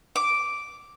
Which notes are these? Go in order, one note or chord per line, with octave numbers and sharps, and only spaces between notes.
D6